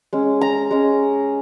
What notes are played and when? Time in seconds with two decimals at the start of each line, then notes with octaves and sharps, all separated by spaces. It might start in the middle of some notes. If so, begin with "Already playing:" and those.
0.13 G#3 C#4
0.41 A#5
0.71 G#3 C#4